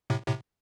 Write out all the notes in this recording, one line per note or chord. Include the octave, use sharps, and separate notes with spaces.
A2 C3
A2 C3